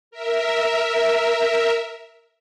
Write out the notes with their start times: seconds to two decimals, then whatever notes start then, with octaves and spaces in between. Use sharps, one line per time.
0.11 A#4 E5